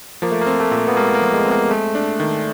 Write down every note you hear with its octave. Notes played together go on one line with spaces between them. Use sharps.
F3 A#3
A3
A#3
C4
A3
A#2
B3
G#3 A#3
A#3
F3
G#3
C4
A#3
G#3 A3
D4
D#3